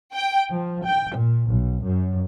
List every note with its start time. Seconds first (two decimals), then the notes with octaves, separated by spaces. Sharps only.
0.13 G5
0.51 F3
0.84 G5
1.16 A#2
1.48 B1
1.83 F#2